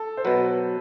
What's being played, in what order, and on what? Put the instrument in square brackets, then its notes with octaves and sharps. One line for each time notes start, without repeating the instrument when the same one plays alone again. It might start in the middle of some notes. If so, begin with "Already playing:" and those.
Already playing: [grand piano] A4
C5
[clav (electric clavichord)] B2 F#3 [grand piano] B4